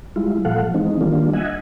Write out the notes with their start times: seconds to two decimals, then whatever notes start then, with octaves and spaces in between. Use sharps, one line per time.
0.16 G3 G#3 E4 F4
0.45 A#2 F3 A4 F5 F#5
0.74 E3 G#3 C4 D#4
1.01 D#3 G3 A#3 D4 F4
1.33 D#5 E5 F#5 G#5